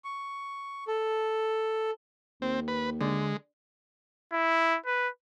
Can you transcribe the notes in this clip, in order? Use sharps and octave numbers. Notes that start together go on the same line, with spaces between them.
C#6
A4
D#2 C4
B4
D3 G#3
E4
B4